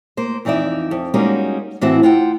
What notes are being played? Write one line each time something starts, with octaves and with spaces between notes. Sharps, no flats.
A#3 C5
F2 E3 D#4 D5 E5
F2
G3 G#3 A#3 C#4 D#4 F#4
A2 E3 C4 F#4 E5
F4 F#5 G5